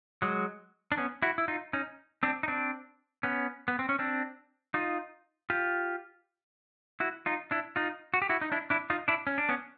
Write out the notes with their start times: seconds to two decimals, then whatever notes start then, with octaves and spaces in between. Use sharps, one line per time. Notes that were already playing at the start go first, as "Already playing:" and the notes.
0.22 F#3 G#3
0.92 D4
0.98 B3 C#4
1.22 E4 F#4
1.38 E4
1.48 D#4 F4
1.73 C#4 D#4
2.23 C4 D4
2.43 D#4
2.48 C4 D4
3.23 B3 C#4
3.68 B3
3.79 C4
3.89 C#4
3.99 C4 D4
4.74 D#4 F4
5.50 F4 G4
7.00 E4 F#4
7.26 D#4 F4
7.51 D4 E4
7.76 D#4 F4
8.14 F#4
8.22 G4
8.29 E4 F#4
8.41 D#4
8.52 D4 E4
8.70 D4 E4
8.90 D#4 F4
9.08 D4 E4
9.27 C#4
9.38 D4
9.49 B3 C#4